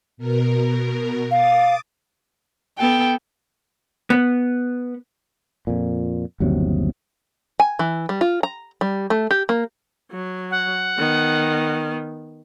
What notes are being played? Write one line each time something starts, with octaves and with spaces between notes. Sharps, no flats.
B2 A#4
F5 D6 D#6 A6
B3 A4 G5
B3
F2 A#2
G1 D#2 C3 F#3
G#5
E3
G3
F4
A#5
G3
A3
G4
A#3
F#3
F#5
D#3 B3